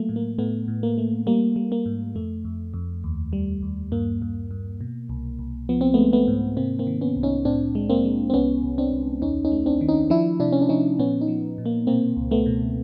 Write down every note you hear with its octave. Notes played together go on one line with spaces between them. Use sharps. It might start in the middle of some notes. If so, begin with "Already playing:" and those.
Already playing: F#3 A3 A#3
A2
A#3
A2 A3 B3
A2
A#3
A3
G3 A#3
G3
A#3
G#2
F2 A3
F2
F2
D#2
G3
D#2
G2 A#3
G2
G2
B2
C2
C2
F3 B3
C4
G#3 A3 B3
A3 B3
G#2
C3 A#3 C4
A#3 C4
D#3
B3 C#4
C2
C#4 D#4
A2 C4 D4
G#3
A#3 C4
G#3
C4
C2 B3 C#4
C2
C4 D4
C2
D#2 C#4 D#4
C#4 D#4
A3
C4 D4
D#3
C#4 D#4
F3 D4 E4
C3 D4 E4
C#4
D4
F3 C#4 D#4
A#2 B3 C#4
C#4 D#4
F3
A#2
A#3
B2 A#3 C4
C#2
A3 B3
B2